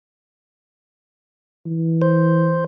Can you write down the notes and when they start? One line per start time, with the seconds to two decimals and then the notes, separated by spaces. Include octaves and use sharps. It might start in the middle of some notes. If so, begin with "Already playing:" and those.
1.66 E3
2.02 C5